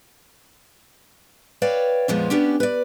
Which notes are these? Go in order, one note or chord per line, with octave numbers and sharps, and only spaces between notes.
B4 C#5 D5 F5 G5 A5
F2 A#2 F3 G#3 B3 F4
B3 C#4 D4 G4
B4 D5